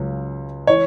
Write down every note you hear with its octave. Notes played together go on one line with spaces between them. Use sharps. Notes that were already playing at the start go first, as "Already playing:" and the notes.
Already playing: C#2 C#3 F#3
E3 C#5